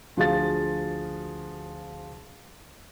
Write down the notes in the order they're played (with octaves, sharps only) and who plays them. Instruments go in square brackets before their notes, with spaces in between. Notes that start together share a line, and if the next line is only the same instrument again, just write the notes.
[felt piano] D2 F3 F#4 G#4 F5 A6